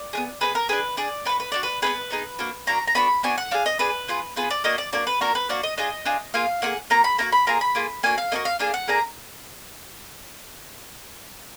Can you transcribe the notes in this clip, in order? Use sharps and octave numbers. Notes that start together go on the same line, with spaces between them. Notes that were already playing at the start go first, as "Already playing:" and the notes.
Already playing: D5
B3 D4 G#4
B3 D4 G#4 B4
A#4
D4 G#4 B4
D4 G#4 D5
D4 F#4 B4
B4
D4 F#4 D5
B4
B3 D#4 G#4 B4
B3 D#4 G#4
A#3 D4 F#4
A#3 D4 F#4 A#5
A#5
B3 D4 F#4 B5
B3 D4 F#4 G#5
F#5
D4 G#4 F5
D#5
D4 G#4 B4
B3 F4 G#4
B3 F4 G#4 B4
D5
A#3 D4 F#4 D#5
D5
A#3 D4 F#4 D5
B4
A#3 D4 F#4 A#4
B4
A#3 D4 F#4 D5
D#5
D4 F4 G#4 D#5
D4 F4 G#4
A#3 F4 G#4 F5
A#3 F4 G#4 F#5
A#3 D#4 F#4 A#5
B5
A#3 D#4 F#4 A#5
B5
A#3 F4 G#4 A#5
B5
A#3 F4 G#4
A#3 D4 F#4 G#5
F5
A#3 D4 F#4 D#5
F5
A#3 D4 G#4 F5
F#5
A#3 D4 G#4 A#5